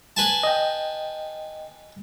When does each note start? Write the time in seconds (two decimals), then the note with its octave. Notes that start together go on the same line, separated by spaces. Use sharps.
0.17 B4 G#5 A5
0.43 D#5 G5